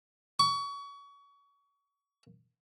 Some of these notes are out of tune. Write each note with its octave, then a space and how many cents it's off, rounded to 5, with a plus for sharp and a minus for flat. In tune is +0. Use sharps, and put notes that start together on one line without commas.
C#6 +30